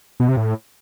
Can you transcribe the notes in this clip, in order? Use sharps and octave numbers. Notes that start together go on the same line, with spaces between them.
B2
C3
A2